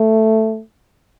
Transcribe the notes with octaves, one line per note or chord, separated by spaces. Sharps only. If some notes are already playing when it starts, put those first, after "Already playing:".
Already playing: A3